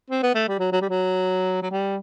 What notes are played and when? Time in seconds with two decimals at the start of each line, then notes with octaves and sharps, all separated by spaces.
0.10 C4
0.23 B3
0.35 A3
0.48 G3
0.59 F#3
0.72 F#3
0.81 G3
0.89 F#3
1.62 F#3
1.71 G3